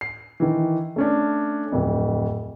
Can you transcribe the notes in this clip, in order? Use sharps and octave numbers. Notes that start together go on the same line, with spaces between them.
C7
D#3 E3
A3 C#4 D4
D1 F2